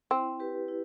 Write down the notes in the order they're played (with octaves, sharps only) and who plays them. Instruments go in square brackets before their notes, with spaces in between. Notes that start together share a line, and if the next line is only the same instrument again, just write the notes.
[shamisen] C4 [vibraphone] E4
[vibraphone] G4 B4
E4